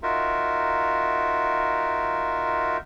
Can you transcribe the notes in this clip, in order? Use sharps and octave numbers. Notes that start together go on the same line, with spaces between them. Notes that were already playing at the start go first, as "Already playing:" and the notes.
D#4 F4 F#4 A#4 E5